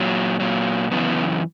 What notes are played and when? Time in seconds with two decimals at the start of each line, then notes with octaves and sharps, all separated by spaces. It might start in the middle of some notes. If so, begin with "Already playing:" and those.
Already playing: A#2 F#3
0.40 A#2 F#3
0.91 F#2 C#3 E3 B3